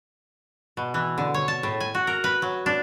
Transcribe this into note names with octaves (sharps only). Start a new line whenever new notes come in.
B2
E3
D3
C#5
A5
A2
G#5
F#4
A#4
B4
F#3
D4